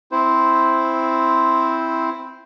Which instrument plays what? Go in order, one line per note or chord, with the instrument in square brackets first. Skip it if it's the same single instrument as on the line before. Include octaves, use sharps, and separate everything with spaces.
[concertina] C4 E4 C5